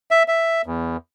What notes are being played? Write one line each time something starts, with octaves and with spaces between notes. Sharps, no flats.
E5
E5
E2